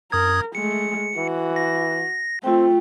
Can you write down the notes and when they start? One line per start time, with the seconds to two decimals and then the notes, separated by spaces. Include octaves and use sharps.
0.12 F#2 A#4 D#6 G#6
0.55 G#3 A3 C#7
1.17 E3 F#4
1.56 A#6
2.44 A3 C4 F4 G5